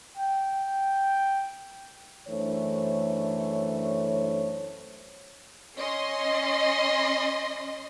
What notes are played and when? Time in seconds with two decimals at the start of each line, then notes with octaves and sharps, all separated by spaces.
0.18 G5
2.28 F#2 E3 A3 D4 C5 C#5
5.76 C#4 D#5 C6